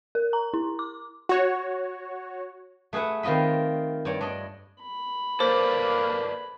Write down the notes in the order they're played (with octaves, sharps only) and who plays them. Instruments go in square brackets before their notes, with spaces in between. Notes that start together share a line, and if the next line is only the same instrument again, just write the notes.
[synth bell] A#4
A#5
E4
D6
[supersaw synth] F#4 C#5
[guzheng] A3 G#4 B4 E5 F#5
D#3 C4 F4 D#5 B5
G2 C#5 D5
D4 D5 D#5
[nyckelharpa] B5
[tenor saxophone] A#3 [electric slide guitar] A4 B4 D5 [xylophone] C5